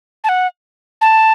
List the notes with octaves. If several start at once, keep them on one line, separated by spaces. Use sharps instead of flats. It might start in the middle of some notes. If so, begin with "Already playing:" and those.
A5
F#5
A5